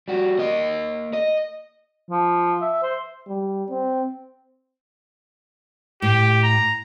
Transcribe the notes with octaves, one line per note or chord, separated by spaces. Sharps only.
G3 F#4
A#3 D#5
D#5
F3
E5
C5
G3
C4
A2 G4
A#5